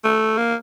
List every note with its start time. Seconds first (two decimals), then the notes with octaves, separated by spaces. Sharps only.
0.04 A3
0.37 A#3